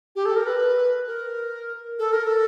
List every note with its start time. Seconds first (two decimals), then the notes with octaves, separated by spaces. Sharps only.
0.16 G4
0.26 A4
0.36 A#4
0.46 B4
1.07 A#4
1.99 A4
2.13 A#4
2.26 A4